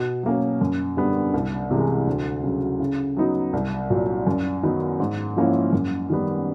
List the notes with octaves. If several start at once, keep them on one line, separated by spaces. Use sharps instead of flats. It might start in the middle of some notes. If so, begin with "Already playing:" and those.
Already playing: B2
F#3 A#3 C#4
F#2
D3 G3 B3
C2
C3 E3 G#3
D2
C#3 F#3
C#3
F#3 B3 D#4
C2
A#2 F#3
F#2
D#3 F#3 B3 D#4
G#2
F3 A#3 C#4 E4
F#2
D#3 G3 B3